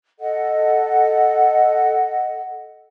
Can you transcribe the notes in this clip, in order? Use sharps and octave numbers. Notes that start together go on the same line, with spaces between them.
A4 D#5 F#5